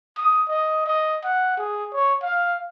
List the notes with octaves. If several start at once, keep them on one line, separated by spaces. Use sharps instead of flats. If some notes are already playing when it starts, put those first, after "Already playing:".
D#6
D#5
D#5
F#5
G#4
C#5
F5